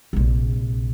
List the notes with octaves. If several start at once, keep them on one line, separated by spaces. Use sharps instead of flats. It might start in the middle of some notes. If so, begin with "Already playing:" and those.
A#1 C3